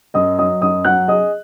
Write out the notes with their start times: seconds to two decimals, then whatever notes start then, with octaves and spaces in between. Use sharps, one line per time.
0.14 F#2 D#5 D#6
0.38 F#3 D#5 D#6
0.62 F#2 D#5 D#6
0.85 F#3 F#5 F#6
1.08 G#4 D#5 D#6